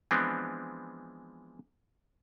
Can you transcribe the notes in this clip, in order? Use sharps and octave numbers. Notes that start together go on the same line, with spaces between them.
E3 F3 G#3 B3 C4 D4